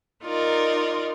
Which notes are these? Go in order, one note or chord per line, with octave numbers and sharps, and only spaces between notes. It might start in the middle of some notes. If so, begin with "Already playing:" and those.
D#4 F4 A#4 D5